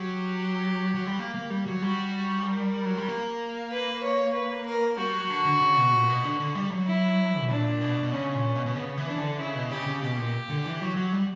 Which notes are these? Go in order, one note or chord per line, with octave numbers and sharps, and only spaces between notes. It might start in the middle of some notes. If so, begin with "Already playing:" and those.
Already playing: F#3 G4
F#3
G3
A#3
A#3
G3
F#3
G3 F#4
A#4
F#3
G3
A#3
B4
C#5
B4
A#4
G3 F#4
F#3
D3
D3
C#3
B2
A#2
B2
D3
D3
G3
F#3
E4
B2
A#2 D4
B2
B2
C#3 C#4
A#2
B2
B2
C#3 B3
E3
D4
D3
C#3 E4
B2
C#3 G4
C#3
B2 G4
A#2
D3
E3
F#3
F#3
G3